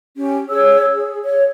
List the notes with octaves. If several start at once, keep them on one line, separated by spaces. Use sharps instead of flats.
C#4 G4
G#4 C#5 E6
G#4
C#5